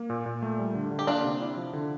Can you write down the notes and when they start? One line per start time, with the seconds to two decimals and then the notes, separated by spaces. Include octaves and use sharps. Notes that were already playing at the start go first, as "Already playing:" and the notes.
Already playing: A#3
0.10 A#2
0.26 A#2
0.42 A3
0.59 G3
0.75 D3
0.91 D3
0.99 G4
1.07 A#3 D4 F4
1.24 C3
1.41 E4
1.56 F3
1.73 D3